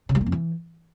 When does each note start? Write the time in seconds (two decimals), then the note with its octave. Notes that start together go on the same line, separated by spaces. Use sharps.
0.09 C#3
0.15 G3
0.21 A#3
0.26 F2
0.32 E3